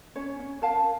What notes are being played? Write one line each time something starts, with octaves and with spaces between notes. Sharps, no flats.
C#4 C#5
C#4
A#4 F5 A5